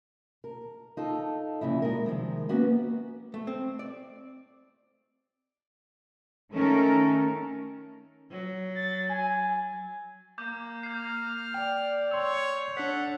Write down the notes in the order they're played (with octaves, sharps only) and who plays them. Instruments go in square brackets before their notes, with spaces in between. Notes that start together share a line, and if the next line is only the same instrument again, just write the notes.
[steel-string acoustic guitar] A#4
D#4 F4 A4
F2 A#2 C#3 E4
G#3 F#4 A#4
C3 D#3 F3 G#3
A#3 B3 C#4 F#4 G4 B4
[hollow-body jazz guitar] A3
C4
D5
[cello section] D#3 A3 C#4 A4 A#4
[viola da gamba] F#3
[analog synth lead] A6
G#5
[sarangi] A#3 [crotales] D6 G6
[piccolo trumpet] F6 [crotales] G6 C7
[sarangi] D5 [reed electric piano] G5 [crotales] F7
[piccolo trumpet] C#5 [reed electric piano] C6 E6 [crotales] F7
[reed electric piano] D4 C#5 [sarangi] A4 [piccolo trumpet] F#5 [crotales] B6